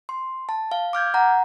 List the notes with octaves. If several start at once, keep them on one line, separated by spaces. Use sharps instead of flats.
C6
A5
F5
D6 F6 G6 G#6
F#5 A#5